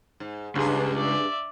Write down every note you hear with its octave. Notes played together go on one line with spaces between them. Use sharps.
G#2
C#2 G2 D4 G#4
D5 E5